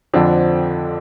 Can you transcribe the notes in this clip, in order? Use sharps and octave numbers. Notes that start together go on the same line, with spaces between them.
F2 D3 F3 C4 D4